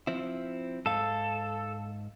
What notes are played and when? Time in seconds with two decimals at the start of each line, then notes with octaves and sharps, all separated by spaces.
0.07 F3 C4 E4
0.86 G#2 A4 F5